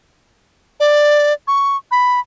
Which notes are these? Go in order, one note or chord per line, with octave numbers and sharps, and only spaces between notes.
D5
C#6
B5